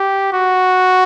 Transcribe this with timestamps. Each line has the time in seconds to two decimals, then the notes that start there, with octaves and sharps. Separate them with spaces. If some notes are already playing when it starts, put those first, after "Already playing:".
Already playing: G4
0.33 F#4